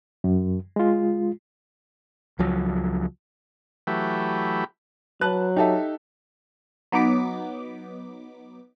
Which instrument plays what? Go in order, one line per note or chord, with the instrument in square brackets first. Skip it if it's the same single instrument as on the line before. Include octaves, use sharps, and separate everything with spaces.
[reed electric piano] F#2
G#3 F4
[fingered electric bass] C#2 F3 F#3
[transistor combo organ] E3 F#3 A3 G4 B4
[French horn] F#3 [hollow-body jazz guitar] B4 [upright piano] A5 F#6
[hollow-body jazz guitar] D#4 [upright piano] G4 A4 E5
[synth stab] F#3 B3 D#4 D6 B6